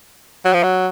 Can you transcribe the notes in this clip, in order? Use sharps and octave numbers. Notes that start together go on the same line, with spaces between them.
F#3
F3
F#3